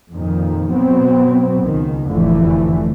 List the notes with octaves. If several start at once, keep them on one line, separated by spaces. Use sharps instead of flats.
F2 A#2 D#3
B2 F#3 B3 C4
C#2 D#3
F1 F2 A2 D3 E3 A3